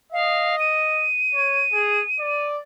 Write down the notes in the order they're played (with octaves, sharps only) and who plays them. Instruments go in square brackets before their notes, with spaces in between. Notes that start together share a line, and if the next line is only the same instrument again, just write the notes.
[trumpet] D#5 [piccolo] F5
[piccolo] D#7
[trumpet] C#5
G#4
D5